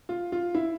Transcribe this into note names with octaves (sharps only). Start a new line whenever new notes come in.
F4
F4
E4